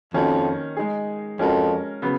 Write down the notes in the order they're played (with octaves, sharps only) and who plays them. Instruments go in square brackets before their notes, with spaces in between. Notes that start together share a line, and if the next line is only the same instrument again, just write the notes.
[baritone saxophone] F2 [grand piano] D#3 A#3 C#4 F#4
[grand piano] G#3 D#4 G#4
[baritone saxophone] F2 [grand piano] G#3 C#4 F#4 A#4
[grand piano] C#3 F#3 B3